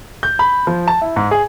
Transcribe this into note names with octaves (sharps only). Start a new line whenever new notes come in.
G6
B5
F3
A5
E4
G#2
G#4